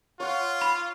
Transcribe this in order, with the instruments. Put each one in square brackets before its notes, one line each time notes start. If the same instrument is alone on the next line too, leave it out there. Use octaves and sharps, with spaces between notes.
[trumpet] F4 [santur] C#5 F#5
[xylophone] B5